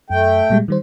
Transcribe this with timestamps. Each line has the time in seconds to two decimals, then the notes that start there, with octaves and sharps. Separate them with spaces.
0.10 F#2 A3 G5
0.50 A#2 G3 G#3
0.68 D#3 G3 C5